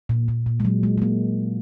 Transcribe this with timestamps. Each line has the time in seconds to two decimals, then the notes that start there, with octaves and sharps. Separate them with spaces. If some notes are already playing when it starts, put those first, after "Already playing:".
0.09 A#2
0.28 A#2
0.46 A#2
0.60 G#3
0.65 F#3
0.83 G#3
0.98 G#3
1.02 A#3